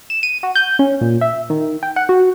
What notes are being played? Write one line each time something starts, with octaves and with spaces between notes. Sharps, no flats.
E7
D#7
F#4
G6
C#4
A#2
E5
D#3
G5
F#5
F#4